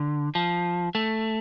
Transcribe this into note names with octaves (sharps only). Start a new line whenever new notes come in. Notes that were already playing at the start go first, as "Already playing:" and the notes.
Already playing: D3
F3
A3